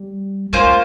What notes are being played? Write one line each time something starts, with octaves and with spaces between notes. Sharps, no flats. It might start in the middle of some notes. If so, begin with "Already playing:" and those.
Already playing: G3
G#3 A#3 C#4 F4 C5